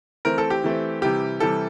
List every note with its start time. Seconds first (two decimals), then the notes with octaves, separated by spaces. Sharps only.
0.25 E3 A3 C4 A#4
0.38 A4
0.50 G4
0.64 E3 A3 C4
1.02 C3 E3 G3 G4
1.40 C3 E3 G3 A4